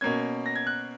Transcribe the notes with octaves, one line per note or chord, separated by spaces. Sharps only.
B2 A#3 C#4 G#6
A#6
G#6
F#6